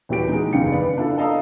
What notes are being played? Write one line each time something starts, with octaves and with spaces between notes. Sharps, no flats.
D#1 E3 F#4 G4 D7
G#3 D#4
F#1 E2 D#3 F5 G5 C#7
B4 D5
D4 E4 F4 A4
A4 D#5 F5 A#5 D#6